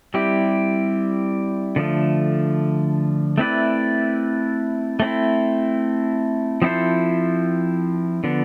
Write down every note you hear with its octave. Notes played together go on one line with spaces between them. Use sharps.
G3 C4 E4 G4
D3 F3 A3
A3 C4 E4 B4 D5
A3 C4 E4
F3 C4 E4 A4 C5
D3 F3 B3